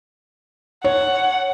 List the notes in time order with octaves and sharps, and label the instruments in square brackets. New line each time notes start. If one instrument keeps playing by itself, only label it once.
[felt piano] C#5 [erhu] F#5